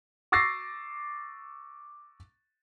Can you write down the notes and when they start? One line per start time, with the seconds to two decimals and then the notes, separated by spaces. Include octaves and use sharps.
0.32 C#6 D6 E6 A6 A#6 C7